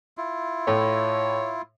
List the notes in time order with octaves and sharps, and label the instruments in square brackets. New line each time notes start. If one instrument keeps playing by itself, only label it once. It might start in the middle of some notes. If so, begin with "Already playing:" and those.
[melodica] E4 F4
[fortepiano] A2 [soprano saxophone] C#5